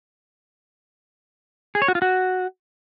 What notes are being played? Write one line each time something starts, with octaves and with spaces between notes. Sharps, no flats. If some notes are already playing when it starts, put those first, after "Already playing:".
G#4
C#5
F#4
F4
F#4